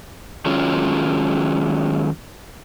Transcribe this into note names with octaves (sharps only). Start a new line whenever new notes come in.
D#3 F#3 G#3 C#4 F4